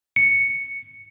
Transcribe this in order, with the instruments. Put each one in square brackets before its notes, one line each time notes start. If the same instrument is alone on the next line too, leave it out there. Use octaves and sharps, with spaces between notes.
[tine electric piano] C#7